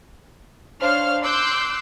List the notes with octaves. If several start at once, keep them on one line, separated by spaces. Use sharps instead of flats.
D4 C5 C#5 F5 F6
C6 D6 E6 F#6 G6